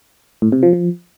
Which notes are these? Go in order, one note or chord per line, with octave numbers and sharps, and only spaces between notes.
A2
C3
F3
F3